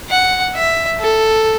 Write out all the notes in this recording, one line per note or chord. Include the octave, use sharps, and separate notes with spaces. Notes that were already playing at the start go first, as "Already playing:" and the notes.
F#5
E5
A4